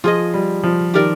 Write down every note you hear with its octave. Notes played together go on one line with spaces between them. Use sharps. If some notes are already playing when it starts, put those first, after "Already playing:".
F3 F4 G#4 D#5
G3
F3
D#3 G4 A#4 D5